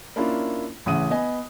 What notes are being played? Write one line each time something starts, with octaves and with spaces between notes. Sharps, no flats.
A#3 C#4 D4 E4 F4
A1 C#3 E3 F#5 D#6 D#7
B3 D#5 G#5